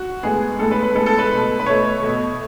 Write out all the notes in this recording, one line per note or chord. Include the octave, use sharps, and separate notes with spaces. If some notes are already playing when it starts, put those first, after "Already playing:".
Already playing: F#4
A2 G#3 B3 G#4
A2 G#3 B3 A4
B4
B4
A2 G#3 B3 A4
A4
B4
B2 A3
B4
B2 A3 C#5
B2 A3